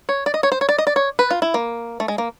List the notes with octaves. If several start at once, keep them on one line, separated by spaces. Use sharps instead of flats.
C#5
D5
D#5
C#5
C5
C#5
D5
D#5
D5
C#5
B4
F4
E4
A#3
A3
G#3
A#3